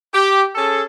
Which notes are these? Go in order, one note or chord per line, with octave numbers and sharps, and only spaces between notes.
G4
C#4 G#4 A4